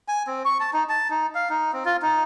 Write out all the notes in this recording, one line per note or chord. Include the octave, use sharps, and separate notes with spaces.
G#5
C4
C#6
A5
D#4
A5
D#4
F5
D#4
C4
F4
D#4